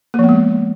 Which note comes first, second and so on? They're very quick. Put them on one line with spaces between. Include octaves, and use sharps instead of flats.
A#3 F3 B3 G#3